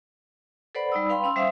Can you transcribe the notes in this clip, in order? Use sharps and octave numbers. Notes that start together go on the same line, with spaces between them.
A4 B4 C5 D5 F#5 B5
G3 D#4 D5 B5 D#6 E6
B4 F5 G5 B5 C6
C#4 C6 E6
G3 C5 E5 F5 D#6